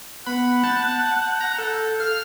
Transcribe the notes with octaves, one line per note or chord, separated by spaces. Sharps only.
B3 F#5 B5
A5 G6
A#5
A4
F5 F6